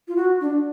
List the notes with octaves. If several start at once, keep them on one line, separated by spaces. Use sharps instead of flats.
F4
F#4
D4